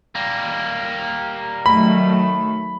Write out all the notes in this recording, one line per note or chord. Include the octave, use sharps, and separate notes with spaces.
G3 A#3
D#3 F#3 A3 B5